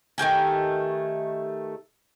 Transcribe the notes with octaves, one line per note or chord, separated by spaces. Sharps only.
D#3 A3 G4 G#5